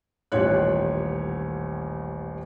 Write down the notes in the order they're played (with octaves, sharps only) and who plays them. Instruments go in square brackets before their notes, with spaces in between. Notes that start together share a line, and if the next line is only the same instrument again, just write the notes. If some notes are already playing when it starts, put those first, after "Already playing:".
[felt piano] D#1 A1 D#3 F4 C#5 F#6